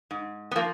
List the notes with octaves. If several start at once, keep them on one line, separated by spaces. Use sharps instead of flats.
G#2
B3
F3 A#3